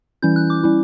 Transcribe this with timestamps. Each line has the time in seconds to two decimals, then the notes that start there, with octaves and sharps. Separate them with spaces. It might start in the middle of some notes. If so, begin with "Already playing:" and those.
0.22 E3 G3 C#4 E4 G6
0.36 F#6
0.50 D6
0.63 G3 C#4 E4